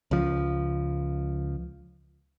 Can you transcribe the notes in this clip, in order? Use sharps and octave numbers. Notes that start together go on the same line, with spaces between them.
C#2 F3